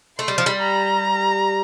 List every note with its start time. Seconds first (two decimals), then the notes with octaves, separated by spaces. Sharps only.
0.18 A3 C6
0.28 G3
0.38 F3
0.46 G3
0.62 A#5